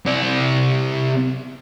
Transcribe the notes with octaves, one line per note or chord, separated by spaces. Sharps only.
C3 D5